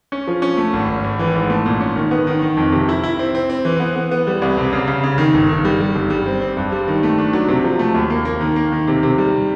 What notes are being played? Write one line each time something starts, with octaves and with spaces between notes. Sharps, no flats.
C#4
F3
C#4
A3
G#1
G#1
G#1
E3
G#2
A3
A#2
C#4
D#3
B3
D#3
D#3
F2
C3
E4
E4
C4
C4
C4
E3
B3
B3
B3
G3
C2
C3
C#3
C#3
C#3
D#3
G1
D#3
G3
G3
G1
G3
C4
C4
G2
G3
D#3
A3
D4
F#3
C3
F3
A3
D#2
A#3
A#3
D#3
A#3
D#3
C3
C3
G3